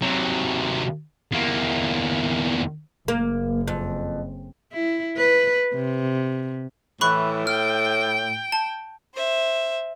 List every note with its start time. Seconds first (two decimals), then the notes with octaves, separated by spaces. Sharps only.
0.02 C3 F#3
1.31 E2 A#3
3.08 F#1 A#3
3.68 F2
4.73 E4
5.17 B4
5.74 C3
7.01 A2 E3 B5 C#6 F#6
7.47 G5 F6
8.52 A5
9.14 C5 E5